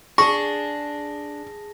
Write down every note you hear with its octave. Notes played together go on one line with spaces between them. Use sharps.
D4 G#4 A5 C#6 A#6